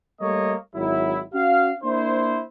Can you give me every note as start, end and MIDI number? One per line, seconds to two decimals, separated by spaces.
0.21 0.56 55
0.21 0.56 57
0.21 0.56 58
0.21 0.56 73
0.21 0.56 75
0.75 1.21 32
0.75 1.21 54
0.75 1.21 64
1.34 1.72 61
1.34 1.72 66
1.34 1.72 77
1.84 2.42 58
1.84 2.42 62
1.84 2.42 64
1.84 2.42 72